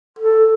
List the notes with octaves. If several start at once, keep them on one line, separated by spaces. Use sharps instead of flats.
A4